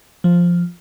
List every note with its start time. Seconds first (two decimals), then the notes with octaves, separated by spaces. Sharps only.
0.24 F3